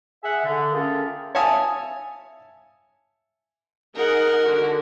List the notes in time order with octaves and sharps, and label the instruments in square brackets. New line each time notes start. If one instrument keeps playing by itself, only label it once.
[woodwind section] G#4 E5 F#5
D3
A3 A#3 C#4 F4 G#4 G5
[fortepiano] C#5 E5 F5 G#5 A5 D#6
[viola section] D#4 G#4 F#5 [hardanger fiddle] A#4
[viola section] D3 F#4